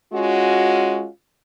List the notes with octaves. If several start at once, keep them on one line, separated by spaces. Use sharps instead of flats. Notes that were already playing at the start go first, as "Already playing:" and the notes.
G#3 C#4 F4 F#4